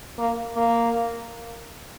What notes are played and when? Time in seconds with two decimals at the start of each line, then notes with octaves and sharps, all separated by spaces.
0.18 A#3
0.57 A#3